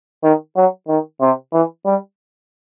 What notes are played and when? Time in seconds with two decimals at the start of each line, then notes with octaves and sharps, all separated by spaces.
0.23 D#3
0.56 F#3
0.88 D#3
1.21 C3
1.53 E3
1.86 G3